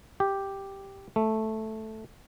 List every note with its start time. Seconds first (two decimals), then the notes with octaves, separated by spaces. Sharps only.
0.20 G4
1.16 A3